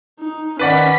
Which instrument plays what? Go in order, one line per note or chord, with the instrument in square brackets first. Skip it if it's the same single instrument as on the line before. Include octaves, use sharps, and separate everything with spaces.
[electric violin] D#4
[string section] D#3 B6 [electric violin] C#4 [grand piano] B4 D5 F#5